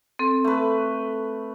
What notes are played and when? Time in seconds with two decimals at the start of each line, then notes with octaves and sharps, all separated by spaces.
0.19 C4 A4
0.44 A3 B4